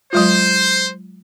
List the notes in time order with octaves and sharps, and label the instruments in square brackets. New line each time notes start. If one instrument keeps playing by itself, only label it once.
[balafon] F#3 G#3 F4 [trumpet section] C5